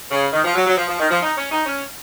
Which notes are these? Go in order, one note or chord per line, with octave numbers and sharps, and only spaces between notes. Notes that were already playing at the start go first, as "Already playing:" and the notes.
C#3
D#3
F3
F#3
F#3
F3
F3
D#3
F3
D#4
C#4
D#4
C#4